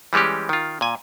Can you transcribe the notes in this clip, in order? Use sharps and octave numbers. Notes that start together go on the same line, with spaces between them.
E3 G3 G#3 C#4 G4
D#3 F4
A#2 G#5